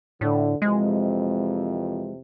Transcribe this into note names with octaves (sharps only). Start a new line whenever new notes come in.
A2 D3
F2 C3 E3 G#3